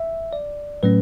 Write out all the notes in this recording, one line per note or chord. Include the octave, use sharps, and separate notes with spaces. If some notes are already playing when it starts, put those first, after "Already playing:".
Already playing: E5
D5
A2 F#3 A3 C#4 B4